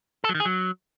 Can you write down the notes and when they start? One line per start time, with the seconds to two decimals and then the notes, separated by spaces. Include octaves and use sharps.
0.24 A4
0.29 F#3
0.35 D#3
0.40 G#4
0.45 F#3